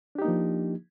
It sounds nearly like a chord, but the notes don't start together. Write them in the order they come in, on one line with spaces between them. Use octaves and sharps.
D4 G4 D#4 A#3 F3